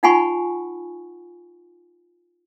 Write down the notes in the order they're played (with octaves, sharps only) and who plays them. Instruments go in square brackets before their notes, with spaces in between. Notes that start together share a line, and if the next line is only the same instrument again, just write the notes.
[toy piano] D#4 F4 F#5 G#5 B5 C#6